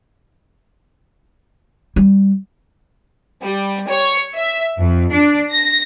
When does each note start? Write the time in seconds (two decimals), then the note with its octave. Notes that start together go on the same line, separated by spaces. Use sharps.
1.96 G3
3.43 G3
3.89 C#5
4.35 E5
4.79 F2
5.12 D4
5.52 A#6